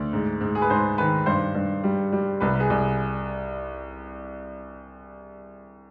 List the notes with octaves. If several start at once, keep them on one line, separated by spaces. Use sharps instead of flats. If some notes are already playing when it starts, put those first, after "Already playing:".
Already playing: D2 D5
G#2
G#2
G#4
B4
G#2 C5
D#3 B4
G2 C5
G2
G3
G3
C2 B4
B4
G#4
C2